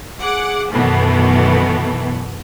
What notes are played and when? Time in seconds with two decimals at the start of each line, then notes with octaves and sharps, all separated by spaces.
0.20 G#4 F#5 D6
0.72 F#2 B2 D#3 E3 A3 B3